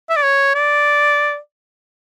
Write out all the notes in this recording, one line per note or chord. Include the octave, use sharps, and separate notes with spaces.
E5
D5
C#5
D5